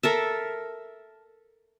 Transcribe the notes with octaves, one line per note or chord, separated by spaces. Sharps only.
A4 A#4 E5